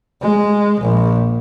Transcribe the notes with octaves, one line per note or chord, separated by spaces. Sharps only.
G#3
A#1